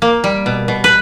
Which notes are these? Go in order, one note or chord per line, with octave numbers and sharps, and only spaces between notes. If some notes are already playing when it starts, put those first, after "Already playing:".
A#3
G3
B2
B2
B4